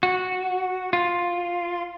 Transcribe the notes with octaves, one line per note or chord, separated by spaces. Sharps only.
F#4
F4